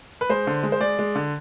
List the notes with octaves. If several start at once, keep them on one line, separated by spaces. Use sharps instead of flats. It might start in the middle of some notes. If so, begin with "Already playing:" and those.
B4
G#3 C5
D3
G#3
C5
G#3 D5
G#3
D3